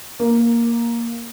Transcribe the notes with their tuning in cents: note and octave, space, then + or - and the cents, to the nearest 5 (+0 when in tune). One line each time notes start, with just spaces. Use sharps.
A#3 +5